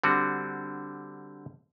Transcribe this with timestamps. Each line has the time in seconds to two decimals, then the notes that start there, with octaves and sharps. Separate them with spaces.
0.04 D3 G3 C4 F#4